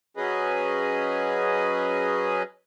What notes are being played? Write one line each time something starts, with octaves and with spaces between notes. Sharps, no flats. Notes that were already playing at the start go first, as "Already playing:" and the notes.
F#3 C#4 G#4 B4 D#5